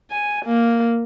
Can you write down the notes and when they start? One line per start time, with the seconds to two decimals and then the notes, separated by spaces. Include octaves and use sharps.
0.11 G#5
0.46 A#3